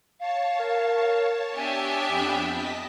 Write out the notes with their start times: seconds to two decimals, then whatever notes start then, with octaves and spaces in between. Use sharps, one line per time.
0.20 C#5 F5 A5
0.60 A#4
1.56 B3 D4 G4 E5 G#5
2.09 F2 G5 B5
2.53 D#5 A5 B6